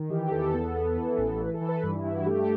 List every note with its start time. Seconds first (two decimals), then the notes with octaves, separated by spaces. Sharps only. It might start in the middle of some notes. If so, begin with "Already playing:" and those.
Already playing: D#3
0.10 E3 G4
0.28 G4
0.31 E2 A4
0.54 B3
0.76 B3
0.96 E3
1.18 A1
1.39 E3 B4
1.54 A4
1.61 E3
1.68 B4
1.83 G2 B4
1.95 E4
2.05 G2 E4
2.15 F#4
2.26 A3 G4